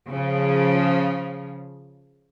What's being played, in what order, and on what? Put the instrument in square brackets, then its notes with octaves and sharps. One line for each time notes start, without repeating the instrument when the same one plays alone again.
[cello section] C#3 F3